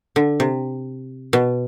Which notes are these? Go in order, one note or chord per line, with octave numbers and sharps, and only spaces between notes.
D3
C3
B2